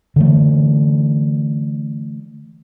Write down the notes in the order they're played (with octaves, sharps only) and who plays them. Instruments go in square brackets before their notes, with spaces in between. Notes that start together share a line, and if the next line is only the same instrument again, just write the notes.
[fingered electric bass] D3 E3 A3